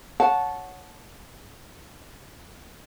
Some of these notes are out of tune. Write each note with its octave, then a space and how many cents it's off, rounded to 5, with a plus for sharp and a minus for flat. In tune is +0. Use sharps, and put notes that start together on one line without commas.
C#5 +0 F#5 -10 A5 -15